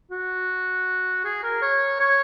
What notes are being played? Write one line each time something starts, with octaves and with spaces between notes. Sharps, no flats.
F#4
G#4
A#4
C#5
C#5